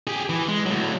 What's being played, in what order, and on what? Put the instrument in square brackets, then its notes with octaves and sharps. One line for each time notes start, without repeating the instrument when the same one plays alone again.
[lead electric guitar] G4 G#4
E3
G#3
A2 F#3